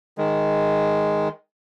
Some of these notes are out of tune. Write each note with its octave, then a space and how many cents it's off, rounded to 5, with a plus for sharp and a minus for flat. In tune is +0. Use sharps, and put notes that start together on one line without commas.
D#3 +0 G#3 +0